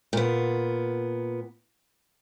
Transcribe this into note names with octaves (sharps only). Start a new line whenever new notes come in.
A#2 B3